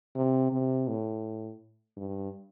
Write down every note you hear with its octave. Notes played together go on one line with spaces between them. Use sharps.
C3
C3
A2
G2